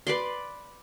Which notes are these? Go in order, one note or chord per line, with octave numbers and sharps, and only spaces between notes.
B4 D5 C6